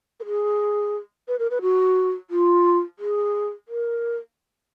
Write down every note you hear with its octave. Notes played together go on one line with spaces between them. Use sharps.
A#4
G#4
B4
A#4
B4
F#4
F4
G#4
A#4